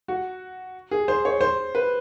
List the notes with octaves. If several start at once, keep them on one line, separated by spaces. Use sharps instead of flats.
F#4
G#4
C5
C#5
C5
B4